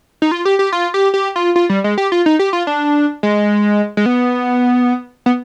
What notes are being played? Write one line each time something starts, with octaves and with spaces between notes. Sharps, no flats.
D#4
F4
G4
G4
F4
G4
G4
F4
F4
G3
G#3
G4
F4
D#4
G4
F4
D4
G#3
G#3
B3
B3